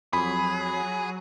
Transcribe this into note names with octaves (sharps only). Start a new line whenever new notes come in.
F2 F#3 G#4 B5